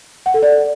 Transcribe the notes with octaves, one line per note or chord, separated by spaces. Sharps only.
F#5
A4
D5